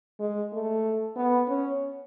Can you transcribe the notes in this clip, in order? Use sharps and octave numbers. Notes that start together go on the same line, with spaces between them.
G#3
A3
B3
C#4